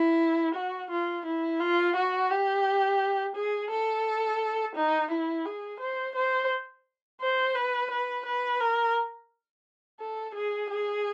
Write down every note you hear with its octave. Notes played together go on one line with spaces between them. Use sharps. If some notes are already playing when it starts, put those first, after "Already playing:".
Already playing: E4
F#4
F4
E4
F4
F#4
G4
G#4
A4
D#4
E4
G#4
C5
C5
C5
B4
B4
B4
A#4
A4
G#4
G#4